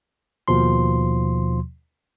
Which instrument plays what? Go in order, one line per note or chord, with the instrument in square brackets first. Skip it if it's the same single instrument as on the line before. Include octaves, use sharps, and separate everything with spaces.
[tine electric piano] D#2 B2 F3 C6